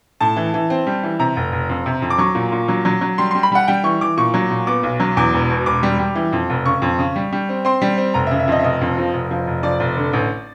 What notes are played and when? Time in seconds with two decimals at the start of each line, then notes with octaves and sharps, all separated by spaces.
0.21 A2 A5
0.36 E3
0.54 E3
0.70 C4
0.87 G3
1.03 E3
1.19 C3 A#5
1.37 F1
1.52 F1
1.69 F2
1.86 C3
2.02 F2
2.10 D6
2.18 F#3 C#6
2.35 A#2
2.52 A#2
2.68 F#3
2.85 F#3
3.01 F#3
3.18 G3 C6
3.31 G3 C6
3.43 B5
3.52 G3 F#5
3.68 G3 G5
3.84 E3 C#6
4.01 E3 D6
4.17 A#2 C#6
4.34 F#3
4.51 A#2
4.67 B3 D6
4.83 B1
5.00 F#3
5.17 E2 D6
5.34 E1
5.50 B2
5.66 E1 D6
5.83 G3
5.99 G3
6.15 E3
6.33 F2
6.50 F1
6.65 C#3 C#6
6.82 F2
6.99 C#3
7.16 G3
7.32 G3
7.49 C4
7.65 C4 C6
7.82 G3
7.97 C4
8.14 F1 A#5
8.27 E5
8.31 C#3
8.40 E5
8.48 F2 D#5
8.59 E5
8.64 F1 D#5
8.81 F2
8.98 F3
9.14 F1
9.31 F3
9.47 F1
9.63 F3 D5
9.80 F1
9.97 D3
10.13 A1